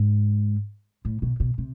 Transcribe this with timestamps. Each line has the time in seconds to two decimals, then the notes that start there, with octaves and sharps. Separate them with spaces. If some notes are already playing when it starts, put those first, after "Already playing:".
Already playing: G#2
1.05 A2
1.22 B2
1.40 B2
1.58 C3